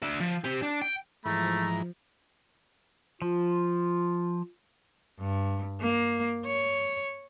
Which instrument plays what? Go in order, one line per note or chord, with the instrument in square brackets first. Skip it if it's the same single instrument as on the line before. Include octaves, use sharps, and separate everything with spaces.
[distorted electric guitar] D4 E5
F3
C4 G4
D4
G5
[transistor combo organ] G#2 E3 [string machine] F3 [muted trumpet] A3 [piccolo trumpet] A#5
[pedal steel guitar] F3 [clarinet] F4
[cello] G2
A#3
C#5